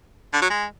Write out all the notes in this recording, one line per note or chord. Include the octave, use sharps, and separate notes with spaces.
D3
F#3
G#3